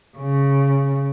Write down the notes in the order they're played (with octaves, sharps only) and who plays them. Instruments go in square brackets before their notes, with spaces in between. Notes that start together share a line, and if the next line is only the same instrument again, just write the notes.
[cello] C#3